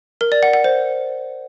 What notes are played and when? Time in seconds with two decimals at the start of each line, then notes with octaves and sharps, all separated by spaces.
0.21 A#4
0.32 D5
0.43 F#5
0.53 F#5
0.64 C5